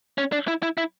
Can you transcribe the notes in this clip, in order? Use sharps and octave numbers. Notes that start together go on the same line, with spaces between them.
C#4
D4
E4
E4
E4